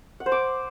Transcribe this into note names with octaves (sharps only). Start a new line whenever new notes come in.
F#5
C5
D6